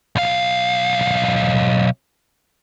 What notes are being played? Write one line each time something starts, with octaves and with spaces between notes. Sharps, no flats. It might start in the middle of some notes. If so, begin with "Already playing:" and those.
B1 F5